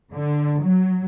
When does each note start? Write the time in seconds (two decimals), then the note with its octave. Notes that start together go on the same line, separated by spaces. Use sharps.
0.14 D3
0.63 F#3